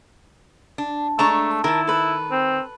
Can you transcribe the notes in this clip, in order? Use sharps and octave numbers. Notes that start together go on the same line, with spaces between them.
D4
G#3 A3 D4 A5 A#5 C#6
D#3 E4 A#4 A5
A4 B4
C4